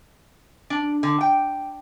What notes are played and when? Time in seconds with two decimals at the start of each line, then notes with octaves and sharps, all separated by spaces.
0.70 D4
1.03 D3
1.21 G5